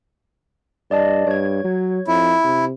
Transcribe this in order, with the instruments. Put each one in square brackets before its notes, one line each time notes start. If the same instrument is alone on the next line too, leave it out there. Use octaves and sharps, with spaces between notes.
[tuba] G2 [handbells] D5 D#5 A5
[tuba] G2 [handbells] C#5 G#6
[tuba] F#3
[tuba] F2 [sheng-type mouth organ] E4
[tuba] C3